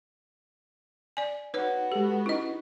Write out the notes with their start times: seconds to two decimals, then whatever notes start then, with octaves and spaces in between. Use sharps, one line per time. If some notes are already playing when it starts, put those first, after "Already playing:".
1.17 D5 G#5
1.54 B3 D#4 F#4 B4 C#5
1.92 G#3 G4 A4
2.26 C#4 D#4 E4 D#5